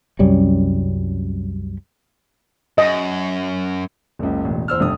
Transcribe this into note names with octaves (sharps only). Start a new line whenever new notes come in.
C2 F#2 G3 C#4
F#2 D#5
F#1 C#2
E1 A1
E2 C5 E6 F6
F1 G2 D#6